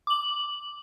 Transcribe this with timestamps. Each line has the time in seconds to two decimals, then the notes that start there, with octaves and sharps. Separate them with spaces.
0.07 D6 F#7